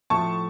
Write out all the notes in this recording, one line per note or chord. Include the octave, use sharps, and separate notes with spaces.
A2 F3 A3 A5 C#6